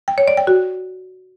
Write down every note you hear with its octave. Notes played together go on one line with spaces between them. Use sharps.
G5
C#5
D5
G5
F#4